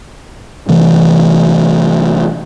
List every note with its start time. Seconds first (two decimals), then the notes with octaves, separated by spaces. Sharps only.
0.68 C3 E3 A3